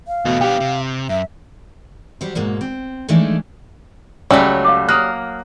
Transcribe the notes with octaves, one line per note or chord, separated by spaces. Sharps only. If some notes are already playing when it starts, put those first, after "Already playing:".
F5
E2 B2 A3
B3 D4 G4
C3
F#2 E5
F#3 G3 C5
G#2 B2 G#3 A#3
C4
E3 F3 G#3 A3 D4 D#4
C#2 F#3 G3 A3 C#4 E5
F5 D6
A#3 D#6 F6 F#6